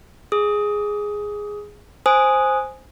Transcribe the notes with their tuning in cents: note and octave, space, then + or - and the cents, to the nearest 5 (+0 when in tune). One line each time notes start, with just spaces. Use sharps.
G#4 +0 D#6 +15
C5 +0 G#5 +0 D#6 +0